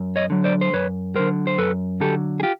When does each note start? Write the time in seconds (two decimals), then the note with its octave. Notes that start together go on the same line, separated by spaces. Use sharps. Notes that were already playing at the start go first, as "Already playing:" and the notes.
Already playing: F#2
0.16 C#5 D#5
0.30 D3 F#3
0.44 C5 D5
0.61 C5
0.73 F#2 B4 C#5
1.15 D3 F#3 A#4 C5
1.47 C5
1.58 F#2 A4 B4
2.00 D3 F#3 G4 A4
2.40 G#4
2.43 F4 G4